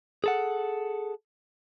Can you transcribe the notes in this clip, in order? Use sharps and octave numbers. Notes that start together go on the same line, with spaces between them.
G#4 A4 F#5